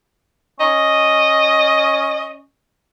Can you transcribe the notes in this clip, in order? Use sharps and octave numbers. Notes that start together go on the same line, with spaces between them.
C#4 D#5